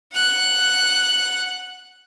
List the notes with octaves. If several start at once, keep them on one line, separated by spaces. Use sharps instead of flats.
F#5 F#6